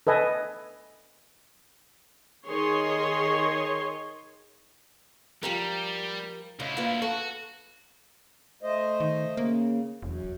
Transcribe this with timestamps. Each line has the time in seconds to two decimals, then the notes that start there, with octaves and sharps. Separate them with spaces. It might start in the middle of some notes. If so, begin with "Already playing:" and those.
0.07 A4 B4 D#5 G#5
2.47 D#3 G#4 C#5 C6
5.43 F3 G3 G4 A#4
6.60 D2 C#3 E4 D#5
6.77 A#3 F4 B4
7.02 F#4 A4
8.63 A3 C5 D#5
9.00 D#3
9.37 C#3 A#3
10.02 E1 F#2